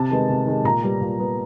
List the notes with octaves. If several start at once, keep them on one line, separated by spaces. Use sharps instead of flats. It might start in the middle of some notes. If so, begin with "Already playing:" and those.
Already playing: C3 A5
D#3 G#3 B3
C3
D#3 G#3 B3
A#2 A#5
G3 B3
A#2
G3 B3